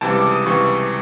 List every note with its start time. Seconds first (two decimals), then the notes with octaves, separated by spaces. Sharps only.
0.01 C#2 C3 E3 G3 A5
0.16 D6
0.31 D#6
0.46 C#2 C3 E3 G3 C#6